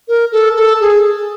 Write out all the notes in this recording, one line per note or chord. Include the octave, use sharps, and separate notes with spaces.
A#4
A4
A4
G#4